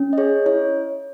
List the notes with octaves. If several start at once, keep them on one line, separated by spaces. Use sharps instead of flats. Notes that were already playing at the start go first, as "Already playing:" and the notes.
Already playing: C#4
D#5
G#4 C#5
E4 C#5